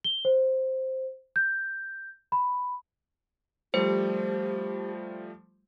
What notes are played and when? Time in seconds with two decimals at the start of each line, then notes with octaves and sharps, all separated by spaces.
0.04 G7
0.25 C5
1.36 G6
2.32 B5
3.74 F3 G3 A3 G4 C5